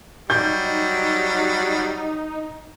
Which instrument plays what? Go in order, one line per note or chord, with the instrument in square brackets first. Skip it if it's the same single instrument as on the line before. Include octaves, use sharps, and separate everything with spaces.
[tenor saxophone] F#3 [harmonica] G3 [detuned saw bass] D#4 [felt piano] G6